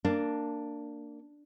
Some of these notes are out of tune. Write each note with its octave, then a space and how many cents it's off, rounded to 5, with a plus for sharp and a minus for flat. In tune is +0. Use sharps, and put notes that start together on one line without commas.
A#3 -20 D4 +0